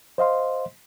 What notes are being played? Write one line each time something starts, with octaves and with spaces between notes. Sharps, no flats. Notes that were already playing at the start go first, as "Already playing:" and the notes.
C5 D#5 F5 C6